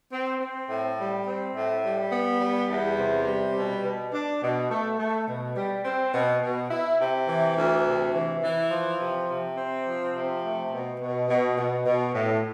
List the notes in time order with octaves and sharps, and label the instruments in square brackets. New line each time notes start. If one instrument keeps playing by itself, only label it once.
[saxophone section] C4
C4
A2
G3
C4
A2
G3
B3
G3
E2
C3
G3
B2
B2
D4
B2
A3
A3
B2
G3
C4
B2
B2
E4
C3
E3
D2
C3
E3
E3
F3
C3
C3
C4
F3
C3
A3
B2
B2
B2
B2
B2
A2